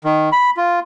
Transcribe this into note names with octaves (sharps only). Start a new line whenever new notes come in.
D#3
B5
F4